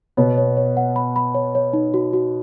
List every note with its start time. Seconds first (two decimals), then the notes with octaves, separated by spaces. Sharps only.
0.17 B2 B3 C#5
0.38 C#5
0.57 C#5
0.77 F#5
0.96 B5
1.16 B5
1.34 C#5
1.55 C#5
1.73 D#4
1.94 F#4
2.13 F#4